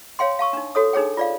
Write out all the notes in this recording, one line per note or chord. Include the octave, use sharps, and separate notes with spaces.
C#5 F5 G5 C6
F5 A5 C#6 E6
D4 D#4
F#4 A4 C#5 D#6
D4 D#4 G#4 C#5 G5
F4 D5 F5